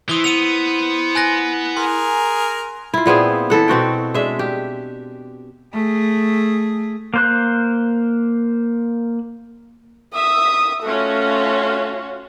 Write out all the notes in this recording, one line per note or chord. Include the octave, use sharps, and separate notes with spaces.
E3 E4 C5 D#6 G7
B3 D#7 F7
G#5 F#6 A#6
G#4 A#4 C6
E4 F4
A#2 B3 C4 G#4
E3 A4 F#5
B2 C4 F#4 G5
G#3 D4 E5
G4
A3 G#4
A#3 C5 F#6
E5 D#6
A3 C#4 F4 F#4